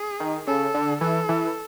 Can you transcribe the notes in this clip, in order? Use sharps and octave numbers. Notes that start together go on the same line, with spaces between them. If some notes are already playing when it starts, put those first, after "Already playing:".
Already playing: G#4
D#3
C#3 A4
D3
E3 A4
E3